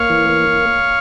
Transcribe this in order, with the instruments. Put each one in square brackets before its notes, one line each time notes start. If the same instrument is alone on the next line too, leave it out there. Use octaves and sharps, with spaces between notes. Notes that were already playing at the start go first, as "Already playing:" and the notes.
Already playing: [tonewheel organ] A#3 [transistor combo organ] C#5 F5
[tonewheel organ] E3
A#3